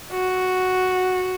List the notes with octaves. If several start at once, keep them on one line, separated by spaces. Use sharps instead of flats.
F#4